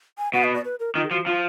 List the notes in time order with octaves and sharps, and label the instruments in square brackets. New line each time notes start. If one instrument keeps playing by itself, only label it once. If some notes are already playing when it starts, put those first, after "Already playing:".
[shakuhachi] G#5
[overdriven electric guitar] B2 [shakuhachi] F#5
[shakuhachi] D#5
D5
B4
A#4
[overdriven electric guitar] D#3 [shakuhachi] F4
[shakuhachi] G#4
[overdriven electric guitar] F3 [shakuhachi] F#4
[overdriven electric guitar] F3 [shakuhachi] F4